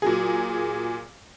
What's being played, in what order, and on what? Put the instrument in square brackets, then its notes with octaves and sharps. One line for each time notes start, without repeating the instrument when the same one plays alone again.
[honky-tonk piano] A#2 F#3 G#4